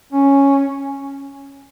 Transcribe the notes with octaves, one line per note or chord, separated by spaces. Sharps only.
C#4